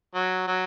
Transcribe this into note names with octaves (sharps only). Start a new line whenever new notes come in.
F#3
F#3